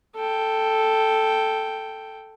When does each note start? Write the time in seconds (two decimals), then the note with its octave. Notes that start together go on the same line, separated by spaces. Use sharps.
0.16 A4 G5